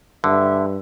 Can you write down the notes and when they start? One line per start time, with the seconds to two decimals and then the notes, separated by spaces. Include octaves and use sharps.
0.24 G2 D3 E5